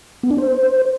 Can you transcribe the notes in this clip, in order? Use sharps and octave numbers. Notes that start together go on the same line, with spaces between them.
B3
D4
C5